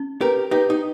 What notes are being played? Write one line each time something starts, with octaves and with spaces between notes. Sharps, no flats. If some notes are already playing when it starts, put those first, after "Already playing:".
Already playing: C#4
G4 A#4 B4
D#4 G4 B4
D#4